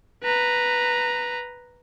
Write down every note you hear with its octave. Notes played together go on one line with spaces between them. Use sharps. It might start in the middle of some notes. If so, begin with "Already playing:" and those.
B4 A#5